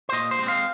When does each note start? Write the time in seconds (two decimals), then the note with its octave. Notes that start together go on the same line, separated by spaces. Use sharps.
0.09 C5
0.13 A#2 D#5
0.31 C5
0.39 G#3 C4
0.48 F5